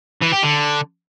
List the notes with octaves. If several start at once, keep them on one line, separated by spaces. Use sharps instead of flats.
E3
G4
D3